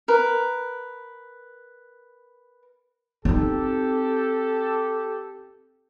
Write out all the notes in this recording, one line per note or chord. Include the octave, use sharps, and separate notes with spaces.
A#4 B4
C4 D#4 G4 A4